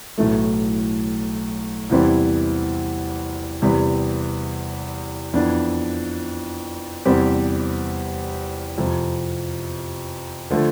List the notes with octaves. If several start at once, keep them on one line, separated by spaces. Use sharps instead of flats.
B1 A2 E3 A3
E2 C3 E3 G3 C4
E2 C3 G3 B3
F2 E3 B3 D4
E2 C3 G3 C4 G4
F2 C3 F3
D3 F3 A3